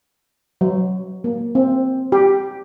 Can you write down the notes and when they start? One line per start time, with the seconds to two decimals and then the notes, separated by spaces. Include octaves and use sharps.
0.61 F#3
1.24 A#3
1.55 C4
2.12 G4